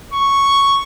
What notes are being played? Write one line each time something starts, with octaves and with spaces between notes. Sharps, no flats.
C#6